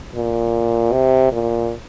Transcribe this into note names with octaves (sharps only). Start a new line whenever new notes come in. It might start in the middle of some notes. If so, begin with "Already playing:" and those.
A#2
C3
A#2